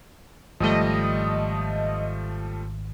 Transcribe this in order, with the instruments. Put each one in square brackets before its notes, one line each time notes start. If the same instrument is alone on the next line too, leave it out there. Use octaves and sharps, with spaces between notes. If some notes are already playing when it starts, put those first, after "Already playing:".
[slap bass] G#1 [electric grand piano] F3 G3 A3 [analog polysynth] D#5